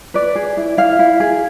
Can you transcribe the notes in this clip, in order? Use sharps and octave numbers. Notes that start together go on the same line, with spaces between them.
B4 D5
G#4
E4
E4 F5
E4
G#4